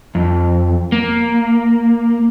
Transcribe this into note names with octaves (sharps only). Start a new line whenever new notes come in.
F2
A#3